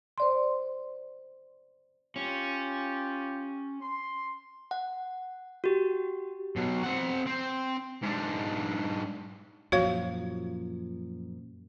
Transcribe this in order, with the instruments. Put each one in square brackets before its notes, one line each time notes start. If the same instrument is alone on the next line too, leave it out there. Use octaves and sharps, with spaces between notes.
[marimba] C5 D5 C6
[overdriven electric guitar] C#4 [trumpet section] F4 G4
[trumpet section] C6
[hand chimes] F#5
F#4 G4
[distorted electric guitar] B2 F#3
C4 F#5
C4
G#2 D4
[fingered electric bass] F#2 A#2 F3 [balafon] F#4 C#5 F5